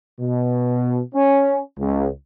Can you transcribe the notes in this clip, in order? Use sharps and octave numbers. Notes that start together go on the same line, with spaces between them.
B2
C#4
C#2